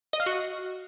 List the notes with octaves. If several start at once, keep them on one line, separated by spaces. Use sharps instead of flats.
D#5
F5
F#4